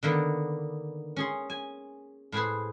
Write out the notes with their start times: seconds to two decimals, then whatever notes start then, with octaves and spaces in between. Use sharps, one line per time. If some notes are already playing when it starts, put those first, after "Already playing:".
0.03 D3 D#3 A#3 B3
1.16 C#4 G#4 C6
1.50 G#5
2.32 A2 G#4 B4 C5